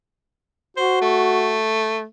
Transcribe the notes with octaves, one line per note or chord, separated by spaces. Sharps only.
F#4 C5
A3